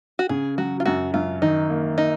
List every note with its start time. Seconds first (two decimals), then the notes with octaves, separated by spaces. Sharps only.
0.19 F#4
0.29 C#3 G#4
0.58 F#3 F#4
0.80 F4
0.85 F#2 F#4
1.14 F#2 F4
1.42 D#3 D#4
1.70 A#3
1.98 D#4